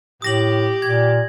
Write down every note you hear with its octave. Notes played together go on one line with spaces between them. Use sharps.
A2 G4 D#6 A#6 F#7
A#2 G#6